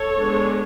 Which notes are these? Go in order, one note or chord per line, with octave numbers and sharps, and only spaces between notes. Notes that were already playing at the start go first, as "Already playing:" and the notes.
Already playing: A4 C#5
G#3 B3 D4